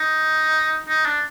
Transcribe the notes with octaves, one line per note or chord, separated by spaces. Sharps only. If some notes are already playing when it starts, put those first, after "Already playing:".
Already playing: D#4
D#4
D4